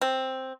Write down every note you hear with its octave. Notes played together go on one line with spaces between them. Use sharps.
C4